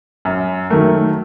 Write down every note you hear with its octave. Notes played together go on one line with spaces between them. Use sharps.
F#2
D#3 F#3 A3 A#4